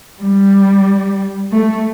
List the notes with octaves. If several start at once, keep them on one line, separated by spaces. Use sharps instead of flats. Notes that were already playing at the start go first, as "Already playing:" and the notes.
G3
A3